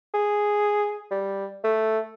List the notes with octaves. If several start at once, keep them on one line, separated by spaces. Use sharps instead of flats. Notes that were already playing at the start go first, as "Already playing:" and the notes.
G#4
G3
A3